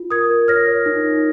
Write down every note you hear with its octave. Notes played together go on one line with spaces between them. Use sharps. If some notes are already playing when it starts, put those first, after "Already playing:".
Already playing: F4
A#4 D#6 G#6
A#4
C#5 F6 A#6
C#5
D#4
D#4